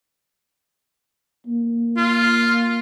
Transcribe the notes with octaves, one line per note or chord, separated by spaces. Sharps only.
A#3
F4